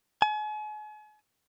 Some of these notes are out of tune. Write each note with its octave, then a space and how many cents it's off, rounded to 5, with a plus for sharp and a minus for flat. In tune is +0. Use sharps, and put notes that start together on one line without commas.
G#5 +40